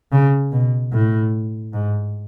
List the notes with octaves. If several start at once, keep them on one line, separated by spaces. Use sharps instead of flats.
C#3
B2
A2
G#2